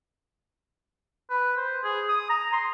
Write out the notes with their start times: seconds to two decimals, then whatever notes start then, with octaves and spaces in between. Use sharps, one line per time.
1.30 B4
1.57 C5
1.84 G#4
2.09 D#6
2.30 A#5
2.53 C6